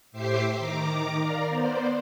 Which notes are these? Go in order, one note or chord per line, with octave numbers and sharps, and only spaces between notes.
A2 G4 C5 E5 D6 C7
D#3 A#5 D6
A#4 D5 F5 A#5
B3 C5 D5